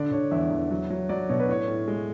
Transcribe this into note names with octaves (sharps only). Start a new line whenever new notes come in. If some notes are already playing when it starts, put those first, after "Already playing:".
Already playing: D3 D5
D3 C#5
E2 E5
E2
F#3
F#3
F#3 D5
B2 C#5
B4
A2 C#5
A2
G#3